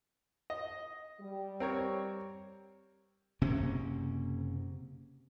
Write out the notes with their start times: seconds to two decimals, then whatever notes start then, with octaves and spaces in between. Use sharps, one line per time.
0.50 D#5
1.21 G3
1.60 C4 A#4 C#5
3.41 F#1 C3 A#3 C#4